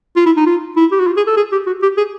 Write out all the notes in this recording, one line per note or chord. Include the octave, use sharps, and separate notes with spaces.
F4
E4
D#4
F4
E4
G4
F#4
F4
G#4
A4
G#4
G4
F#4
G4
G#4